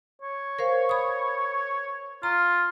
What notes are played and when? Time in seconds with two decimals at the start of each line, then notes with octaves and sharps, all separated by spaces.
0.22 C#5
0.59 A#4 C5 F5
0.89 B5 D#6
2.23 F4 A#5